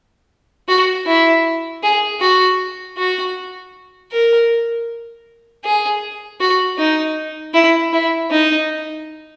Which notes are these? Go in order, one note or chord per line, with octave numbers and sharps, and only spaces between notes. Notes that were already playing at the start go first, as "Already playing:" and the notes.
F#4
E4
G#4
F#4
F#4
A#4
G#4
F#4
D#4
E4
E4
D#4